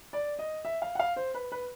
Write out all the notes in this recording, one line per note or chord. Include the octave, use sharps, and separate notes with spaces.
D5
D#5
E5
F5
F#5
F5
C5
B4
B4